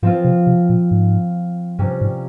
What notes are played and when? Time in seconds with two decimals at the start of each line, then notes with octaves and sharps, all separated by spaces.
0.03 G#2 F3 C4 F4
0.24 C3
0.47 C3
0.69 A#2
0.91 G#2
1.79 G2 C3 G3 C#4
2.01 G#2